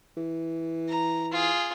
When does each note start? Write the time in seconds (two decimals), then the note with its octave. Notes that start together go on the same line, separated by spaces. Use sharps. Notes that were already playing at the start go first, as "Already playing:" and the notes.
0.17 E3
0.89 A#5
1.32 F4 G#4